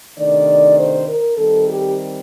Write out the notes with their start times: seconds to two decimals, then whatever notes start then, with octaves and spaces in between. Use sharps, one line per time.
0.17 C3 D#3 A3 D4 D5
0.77 C5
1.07 A#4
1.37 D#3 G3 C4 A4
1.67 G4